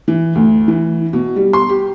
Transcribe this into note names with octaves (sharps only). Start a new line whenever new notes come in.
E3
D2
E3
B2
G3
C6
G4